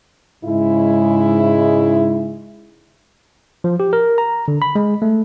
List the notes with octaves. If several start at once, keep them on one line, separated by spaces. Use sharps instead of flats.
G#2 C#3 G#3 E4
F3
G4
A#4
A#5
D3
B5
G#3
A3